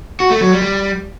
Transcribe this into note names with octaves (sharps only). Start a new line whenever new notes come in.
F#4
A3
F#3
G3
G3